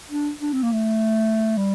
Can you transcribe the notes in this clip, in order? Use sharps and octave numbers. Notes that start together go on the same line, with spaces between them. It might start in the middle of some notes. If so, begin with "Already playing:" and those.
D4
D4
C4
A#3
A3
G3